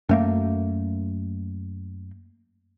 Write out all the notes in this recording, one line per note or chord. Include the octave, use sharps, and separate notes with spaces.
F#2 A3 A#3